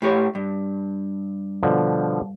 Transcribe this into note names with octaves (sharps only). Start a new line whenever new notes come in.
A2 G4 C#5
G2
B2 D3 F3